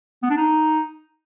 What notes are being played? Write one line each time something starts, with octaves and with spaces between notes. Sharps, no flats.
B3
D4
D#4